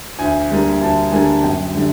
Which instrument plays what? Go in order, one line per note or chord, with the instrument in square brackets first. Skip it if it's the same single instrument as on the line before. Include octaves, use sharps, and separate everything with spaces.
[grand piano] D2 G#5
D3 G3 A#3
D2 A5
D3 G3 A#3 G#5
F#2 G5
D3 G3